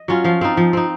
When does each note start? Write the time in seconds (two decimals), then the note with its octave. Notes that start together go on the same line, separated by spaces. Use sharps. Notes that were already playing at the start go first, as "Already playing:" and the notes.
Already playing: D#5
0.08 F#3 C#4 F4
0.24 F3 F5
0.41 C4 D#4 F5
0.57 F3
0.73 C4 D#4